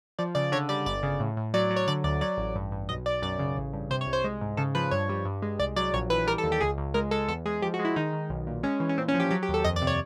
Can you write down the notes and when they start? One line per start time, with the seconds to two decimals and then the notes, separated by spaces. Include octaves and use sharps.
0.19 F3 D5
0.35 C#3 D5
0.52 D3 C#5
0.69 G3 D5
0.86 G1 D5
1.03 C#3
1.20 A2
1.37 A2
1.54 F#3 D5
1.70 F#3
1.76 C#5
1.87 D3 D5
2.04 D2 D5
2.21 F#3 D5
2.38 A1
2.55 G2
2.72 G2
2.89 B1 D#5
3.05 B1 D5
3.22 F#2 D5
3.39 C#3
3.57 A1
3.73 G2
3.90 C3 C5
4.01 C#5
4.07 C2
4.13 C5
4.24 G#3
4.41 G#2
4.57 C#3 A4
4.75 F3 B4
4.91 G2 C#5
5.09 G3
5.25 G2
5.42 G#3
5.59 C2 D5
5.76 F#3 D5
5.93 A#1 C#5
6.10 E3 B4
6.27 G3 A#4
6.38 A4
6.43 D#2
6.52 G4
6.61 C#2 G#4
6.78 C#2
6.94 G#3 A#4
7.11 G#3 A4
7.28 E2 A4
7.46 G#3 G#4
7.62 F3 G4
7.74 F#4
7.79 G#3
7.85 E4
7.96 D#3 D#4
8.13 D#3
8.30 B1
8.47 A#2
8.63 G#3 C#4
8.80 E3
8.89 C#4
8.98 A#2 C4
9.08 C#4
9.14 F3
9.20 G4
9.31 F#3 G4
9.43 G4
9.48 D#2
9.54 A4
9.64 F2 D#5
9.76 D5
9.82 C3
9.87 C#5